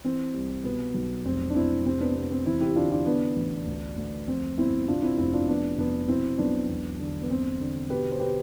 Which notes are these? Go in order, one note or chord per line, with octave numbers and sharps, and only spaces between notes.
E3 C4
C2
B2 B3
B1
F1 C4
D4
F1 C4 E4
C3 C4
B3 D4
C3 B3
C4
E2 C4 E4
E4 G4
D3 D4 F4
D4 F4
D3 B3 D4
A1
D2
D2
F2 C4
G1 C4 E4
C3 D4 F4
C4 E4
F1 C4 E4
D4 F4
F2 B3 D4
F2 B3 D4
B2 C4 E4
B1 B3 D4
E1
D3
B3
G1 C4
D3
B2 G4 B4
C5
B2 G4 B4